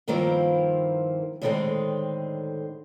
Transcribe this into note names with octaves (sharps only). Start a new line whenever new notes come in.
G2 D#3 F3 A#3 C4 E4
A2 D3 D#3 G3 G#3 C4